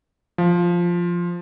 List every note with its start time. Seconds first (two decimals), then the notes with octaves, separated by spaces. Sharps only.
0.38 F3